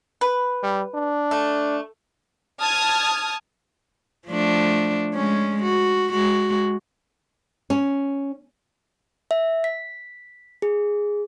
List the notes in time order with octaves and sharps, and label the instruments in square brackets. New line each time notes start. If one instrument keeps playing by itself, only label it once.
[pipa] B4
[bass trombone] G3
D4
[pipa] A3
[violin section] A5 D#6 F6 G#6
[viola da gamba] F3 A3 D4
G#3 C#4
F#4
G#3 F#4
[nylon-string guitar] C#4
[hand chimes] E5
B6
G#4